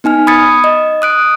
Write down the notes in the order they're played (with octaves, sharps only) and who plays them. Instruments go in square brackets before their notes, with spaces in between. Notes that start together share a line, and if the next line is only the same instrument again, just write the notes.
[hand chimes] B3 D#4 G#5 F6
B5 D#6 G#6 A6 C#7
D#5
D#6 F#6 D7